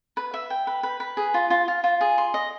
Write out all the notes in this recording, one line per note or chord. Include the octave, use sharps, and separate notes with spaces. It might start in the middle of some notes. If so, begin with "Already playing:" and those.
B4
E5
G5
B4
B4
B4
G#4
F4
F4
F4
F4
G#4
C6
D#5